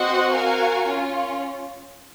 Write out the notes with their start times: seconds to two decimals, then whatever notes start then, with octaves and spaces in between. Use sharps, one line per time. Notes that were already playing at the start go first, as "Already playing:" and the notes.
Already playing: C4 F#4 C5 D#5 F#5
0.30 F#4 A#4 F5 G#5
0.86 C#4 F4